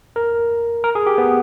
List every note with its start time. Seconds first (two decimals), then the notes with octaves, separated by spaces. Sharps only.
0.16 A#4
0.84 A#4
0.95 G#4
1.07 G4
1.18 B3